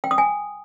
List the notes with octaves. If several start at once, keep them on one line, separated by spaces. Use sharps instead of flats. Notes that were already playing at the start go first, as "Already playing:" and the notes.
G5
D#6
G#5